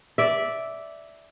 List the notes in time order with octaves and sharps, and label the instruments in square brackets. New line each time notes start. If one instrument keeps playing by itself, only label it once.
[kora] D5 E5